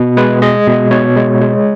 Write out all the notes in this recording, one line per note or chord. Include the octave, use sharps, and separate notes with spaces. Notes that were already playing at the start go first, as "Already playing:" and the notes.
Already playing: B2
G#3 B4
G#3 D#5
B2
B2 C#5
G#3
G#3